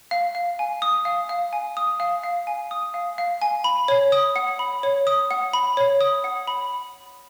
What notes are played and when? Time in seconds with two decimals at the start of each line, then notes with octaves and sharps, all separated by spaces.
0.11 F5
0.35 F5
0.59 G#5
0.82 D#6
1.05 F5
1.29 F5
1.53 G#5
1.77 D#6
2.00 F5
2.23 F5
2.47 G#5
2.71 D#6
2.94 F5
3.18 F5
3.42 G#5
3.64 B5
3.88 C#5
4.12 D#6
4.36 F#5
4.59 B5
4.83 C#5
5.07 D#6
5.31 F#5
5.53 B5
5.77 C#5
6.01 D#6
6.24 F#5
6.47 B5